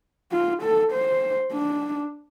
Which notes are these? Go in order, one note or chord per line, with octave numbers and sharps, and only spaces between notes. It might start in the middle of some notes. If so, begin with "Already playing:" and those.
F4
A4
C5
D4